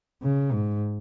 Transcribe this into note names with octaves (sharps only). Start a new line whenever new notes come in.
C#3
G#2